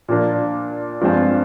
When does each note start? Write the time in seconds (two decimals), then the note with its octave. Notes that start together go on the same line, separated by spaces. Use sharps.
0.08 A#2 F3 A#3 D4 F4
1.01 G2 F3 G#3 C4 F4